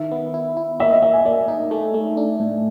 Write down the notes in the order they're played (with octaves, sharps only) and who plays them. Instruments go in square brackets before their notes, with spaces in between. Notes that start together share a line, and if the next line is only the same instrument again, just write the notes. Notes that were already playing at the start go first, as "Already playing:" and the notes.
Already playing: [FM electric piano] D#3 [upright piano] E5
[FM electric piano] B3
E4
E4
[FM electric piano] A#3 [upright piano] E5
[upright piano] D#5
[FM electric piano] A#3 [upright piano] E5
[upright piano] G#5
[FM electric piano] A#3 [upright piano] D5
[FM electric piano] D#4
A3
A3
D4
A2